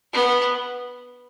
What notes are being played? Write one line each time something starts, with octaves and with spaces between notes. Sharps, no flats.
B3